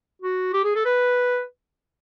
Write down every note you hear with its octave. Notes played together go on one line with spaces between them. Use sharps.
F#4
G4
G#4
A4
B4